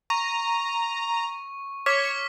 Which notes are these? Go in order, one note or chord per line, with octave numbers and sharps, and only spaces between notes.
A#5 C#6
C#5 D6 F6 B6